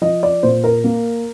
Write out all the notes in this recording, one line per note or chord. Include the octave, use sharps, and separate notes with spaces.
F3 D#5
D5
A#2 C5
A#4
A#3